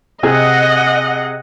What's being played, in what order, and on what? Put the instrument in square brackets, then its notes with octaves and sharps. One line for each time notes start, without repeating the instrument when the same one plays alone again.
[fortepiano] C3 G#4 [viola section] D#5 F#5